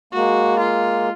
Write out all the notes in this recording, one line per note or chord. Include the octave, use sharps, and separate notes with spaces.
G#3 A#3 F#4
F4